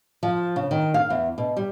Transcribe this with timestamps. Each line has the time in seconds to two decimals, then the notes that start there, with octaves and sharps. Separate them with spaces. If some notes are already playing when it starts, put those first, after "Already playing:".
0.23 F3
0.56 C#3
0.71 D#3
0.94 F5
1.10 E2
1.38 B2
1.57 G3